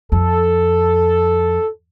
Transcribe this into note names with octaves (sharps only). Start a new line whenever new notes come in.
F2 A4